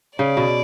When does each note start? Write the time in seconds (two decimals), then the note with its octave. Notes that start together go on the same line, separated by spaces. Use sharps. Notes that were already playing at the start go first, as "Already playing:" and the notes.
0.19 C#3 D5
0.37 B2